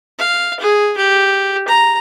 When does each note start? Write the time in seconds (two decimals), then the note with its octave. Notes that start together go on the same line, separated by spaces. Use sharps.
0.18 F5
0.60 G#4
0.97 G4
1.68 A#5